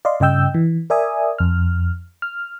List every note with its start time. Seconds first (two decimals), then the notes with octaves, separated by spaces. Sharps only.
0.05 D5 D#5 F5 C6
0.20 G2 C#3 D#5 G5 E6 G6
0.54 E3
0.90 A#4 D5 E5 G#5 D#6
1.39 F2 F6
2.22 F6